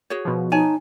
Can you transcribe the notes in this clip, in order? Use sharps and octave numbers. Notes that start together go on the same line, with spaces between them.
F#4 G#4 C#5
B2 F3
D#4 C#5 G#5 A5